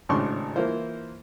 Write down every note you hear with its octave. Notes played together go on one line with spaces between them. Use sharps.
G#1 A2 C#3 D4 C6 C#6
E3 A#3 E4 F4 C5